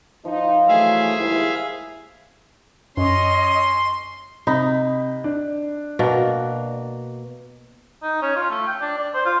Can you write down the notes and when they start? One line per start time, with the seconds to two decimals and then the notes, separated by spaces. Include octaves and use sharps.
0.25 F3 D#4
0.69 E3 F#3 A3 G#4 E5 F5
1.17 D#2 G#2 E4
2.97 F#2 C#4 D#5 C6
4.47 C3 D#4 B5
5.24 D4
5.99 B2 A#3 F#4
8.03 D#4
8.22 C#4
8.36 F4
8.50 A3
8.67 G5
8.81 D4
8.98 D5
9.14 C5
9.25 F4